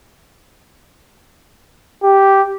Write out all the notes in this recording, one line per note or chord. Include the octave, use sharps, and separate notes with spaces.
G4